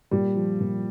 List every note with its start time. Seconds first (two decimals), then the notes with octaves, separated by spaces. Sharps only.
0.11 A#2 G3
0.36 F3
0.61 A#2